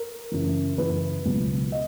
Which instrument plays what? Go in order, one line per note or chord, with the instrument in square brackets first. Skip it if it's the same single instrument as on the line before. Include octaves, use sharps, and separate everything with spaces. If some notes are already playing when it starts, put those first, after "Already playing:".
Already playing: [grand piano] A#4
F#2 C#3 E3
F#2 C#3 E3 B4
C#2 B2 F#3
D#5